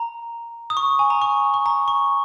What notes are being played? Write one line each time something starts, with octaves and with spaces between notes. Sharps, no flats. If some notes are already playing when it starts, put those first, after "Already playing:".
Already playing: A#5
D#6
C#6
G#5
A#5
C#6
C#6
A#5
C#6